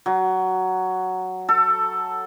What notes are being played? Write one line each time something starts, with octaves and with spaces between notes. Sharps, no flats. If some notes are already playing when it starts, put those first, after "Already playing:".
F#3
A4